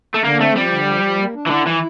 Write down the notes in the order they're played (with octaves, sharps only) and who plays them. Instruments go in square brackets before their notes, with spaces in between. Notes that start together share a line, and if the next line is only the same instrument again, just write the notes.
[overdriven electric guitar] A3
[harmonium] D3 [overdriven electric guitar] A#3
[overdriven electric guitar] A3 [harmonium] C4
[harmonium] F3 [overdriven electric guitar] G3
[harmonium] D3
F3
F3
A#3
D4
[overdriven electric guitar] E3
[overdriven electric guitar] D3 [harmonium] E4
[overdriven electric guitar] E3 [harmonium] E4